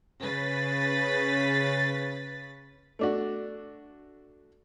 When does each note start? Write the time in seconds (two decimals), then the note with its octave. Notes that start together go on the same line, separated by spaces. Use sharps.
0.20 C#3 B4 A6 B6
2.99 A3 D4 F#4